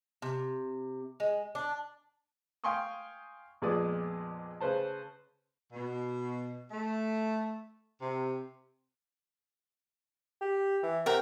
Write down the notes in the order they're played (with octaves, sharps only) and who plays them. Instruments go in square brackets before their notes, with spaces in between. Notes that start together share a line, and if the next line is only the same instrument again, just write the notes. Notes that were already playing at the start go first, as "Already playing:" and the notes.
[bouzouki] C3
G#3
D4
[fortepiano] F5 G5 G#5 C6 C#6 D#6
F2 A#2 G#3 B3 D5 D#6
C#3 B4 C5 A5
[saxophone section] B2
A3
C3
[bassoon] G4
E3
[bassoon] C3 [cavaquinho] A#4 F#5 G5